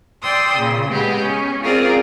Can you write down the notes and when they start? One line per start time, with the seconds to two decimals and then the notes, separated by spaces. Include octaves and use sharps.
0.23 D5 G5 C6 D#6 E6
0.55 A#2 C#3
0.89 G#3 B3 G4 G#4
1.20 C#4
1.63 C4 F4 G#4 A#4 D5